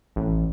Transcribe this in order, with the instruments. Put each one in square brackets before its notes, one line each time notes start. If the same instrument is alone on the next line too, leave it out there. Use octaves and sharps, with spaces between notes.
[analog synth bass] A1